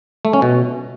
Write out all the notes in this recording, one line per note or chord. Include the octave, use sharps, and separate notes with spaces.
A3
C#4
B2